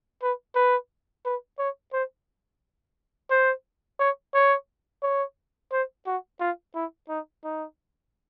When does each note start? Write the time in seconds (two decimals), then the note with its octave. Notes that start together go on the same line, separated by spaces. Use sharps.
0.22 B4
0.55 B4
1.25 B4
1.59 C#5
1.93 C5
3.31 C5
4.00 C#5
4.34 C#5
5.03 C#5
5.72 C5
6.06 F#4
6.40 F4
6.75 E4
7.09 D#4
7.44 D#4